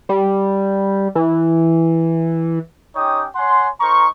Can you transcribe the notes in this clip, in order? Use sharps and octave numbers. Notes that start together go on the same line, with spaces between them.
G3
E3
C#4 D#4 G4 C#5 G5 D#6
C#5 F#5 G#5 C6
D#4 A#4 C5 A#5 C#6